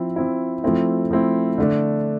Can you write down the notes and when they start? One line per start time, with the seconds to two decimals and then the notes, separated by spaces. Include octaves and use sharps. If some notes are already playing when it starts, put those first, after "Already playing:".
Already playing: F3 C4 E4
0.16 F3 C4 E4
0.64 F3 A3 C4 E4
1.11 F3 A3 C4 E4
1.58 D3 A3 D4